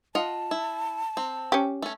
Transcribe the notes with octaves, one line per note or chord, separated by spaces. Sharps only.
F4 D#5 F#5 A5
E4
C4
C#4 G4
A3 C#4